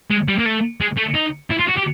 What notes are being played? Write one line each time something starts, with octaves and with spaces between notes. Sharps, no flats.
G#3
G3
A#3
A3
G#3
A3
D#4
E4
F4
F#4
G4